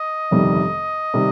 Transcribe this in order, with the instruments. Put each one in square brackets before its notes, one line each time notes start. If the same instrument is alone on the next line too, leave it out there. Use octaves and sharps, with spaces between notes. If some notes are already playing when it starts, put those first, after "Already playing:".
Already playing: [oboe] D#5
[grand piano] G1 F2 C3 D#3 G3
C3 D#3 G3